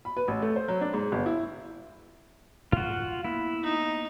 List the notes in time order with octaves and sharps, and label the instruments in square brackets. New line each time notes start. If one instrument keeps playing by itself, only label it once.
[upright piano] B5
B4
A1
A3
C5
F#3
D4
G#2
G1
E4
[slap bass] G#2 [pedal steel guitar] F4 F#4
[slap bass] A#3 B3 [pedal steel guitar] E4
[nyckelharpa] D#4